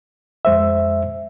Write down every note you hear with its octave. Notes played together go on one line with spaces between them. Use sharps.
F2 G#3 C5 E5